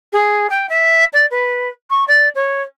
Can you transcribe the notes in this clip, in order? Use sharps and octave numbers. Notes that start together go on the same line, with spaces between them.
G#4
G5
E5
D5
B4
C#6
D5
C#5